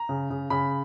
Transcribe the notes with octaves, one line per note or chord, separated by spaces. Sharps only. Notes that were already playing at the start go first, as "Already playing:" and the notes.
Already playing: A#5
C#3
C#3
C#3 B5